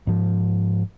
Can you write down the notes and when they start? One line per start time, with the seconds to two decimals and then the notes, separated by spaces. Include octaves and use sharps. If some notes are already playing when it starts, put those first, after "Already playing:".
0.07 G#2 F3